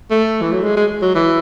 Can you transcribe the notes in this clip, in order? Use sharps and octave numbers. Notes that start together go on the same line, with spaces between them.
A3
E3
F#3
G#3
G#3
F#3
E3